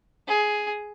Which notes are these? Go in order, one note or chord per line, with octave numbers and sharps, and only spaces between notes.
G#4